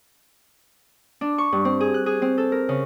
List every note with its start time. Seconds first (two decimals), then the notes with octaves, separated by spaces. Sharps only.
1.21 D4
1.38 C#6
1.52 G2
1.65 C4
1.80 G#4
1.94 F#6
2.06 G#4
2.22 C4
2.38 A4
2.52 A#4
2.69 C#3